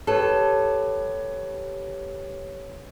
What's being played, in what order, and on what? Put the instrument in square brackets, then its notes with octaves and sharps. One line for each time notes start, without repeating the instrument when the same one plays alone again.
[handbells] G4 B4 C#5 [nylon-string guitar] A4